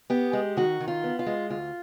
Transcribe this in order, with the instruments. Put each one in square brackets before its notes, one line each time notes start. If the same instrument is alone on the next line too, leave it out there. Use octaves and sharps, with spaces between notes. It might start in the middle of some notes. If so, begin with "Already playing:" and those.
[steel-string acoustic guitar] B3 G4
G#3
D#3 F#4
D#3
F4
B3
F4
G#3
D2 F4